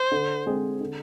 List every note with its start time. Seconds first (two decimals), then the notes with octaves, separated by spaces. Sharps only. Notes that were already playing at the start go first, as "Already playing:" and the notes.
Already playing: C5
0.11 D3
0.46 G#3 C4 G#4
0.81 D3